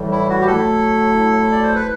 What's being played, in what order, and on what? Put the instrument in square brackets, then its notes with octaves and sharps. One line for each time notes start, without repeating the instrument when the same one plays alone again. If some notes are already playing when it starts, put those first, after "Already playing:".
Already playing: [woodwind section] A2 E3 G3
[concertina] E4
F#4
G4
[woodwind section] F#3 A3 E4 [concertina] A4
[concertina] D5
C5
B4